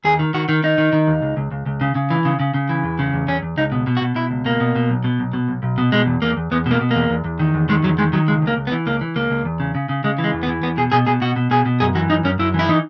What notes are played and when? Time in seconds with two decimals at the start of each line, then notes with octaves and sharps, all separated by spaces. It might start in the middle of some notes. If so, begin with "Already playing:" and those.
0.04 D#2 G#4
0.19 D#3
0.34 D#3 F#4
0.49 D#3
0.63 D#3 D#4
0.78 D#3
0.93 D#3
1.07 D#2
1.22 C#2
1.37 C#2
1.51 C#2
1.66 C#2
1.81 C#3
1.95 C#3
2.10 E3
2.25 C#3
2.40 C#3
2.54 C#3
2.69 E3
2.84 E2
2.99 C#3
3.14 E2
3.27 E2 C#4
3.43 E2
3.57 C#2 D#4
3.72 B2
3.87 B2
3.97 F#4
4.01 B2
4.15 B2 E4
4.31 C#2
4.45 B2 A#3
4.60 B2
4.75 B2
4.89 B1
5.04 B2
5.19 B1
5.33 B2
5.48 B1
5.63 B1
5.78 B2
5.92 B2 G#3
6.07 E2
6.22 E2 A#3
6.37 E2
6.51 E2 B3
6.66 B2
6.71 A#3
6.81 B2
6.91 E2 A#3
7.10 E2
7.24 E2
7.39 D#3
7.54 E2
7.69 D#3 G#3
7.83 E2 F#3
7.98 D#3 G#3
8.13 D#3 F#3
8.28 C#2 G#3
8.42 C#2
8.47 A#3
8.57 C#2
8.67 B3
8.72 E3
8.86 C#2 A#3
9.01 E3
9.16 C#2 A#3
9.30 C#2
9.45 E2
9.60 C#3
9.75 C#3
9.89 C#3
10.04 C#3 G#3
10.18 E3
10.24 G#3
10.33 E2
10.43 B3
10.48 E3
10.62 E2 B3
10.77 B2 G#4
10.92 B2 G#4
11.07 B2 G#4
11.22 B2 F#4
11.36 B2
11.51 B2 G#4
11.66 B2
11.80 F#2 G#4
11.95 E3 F#4
12.10 F#2 D#4
12.24 F#2 C#4
12.39 F#2 E4
12.54 E3 E4
12.68 E3 D#4